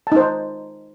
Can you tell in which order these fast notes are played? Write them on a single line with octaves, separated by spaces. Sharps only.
A5 D#4 C5